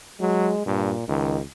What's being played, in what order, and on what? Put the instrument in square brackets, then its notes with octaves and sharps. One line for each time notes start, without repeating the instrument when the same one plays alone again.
[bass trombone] F#3 [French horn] G#3
[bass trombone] G2 [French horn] A#2
[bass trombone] C#2 [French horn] D#3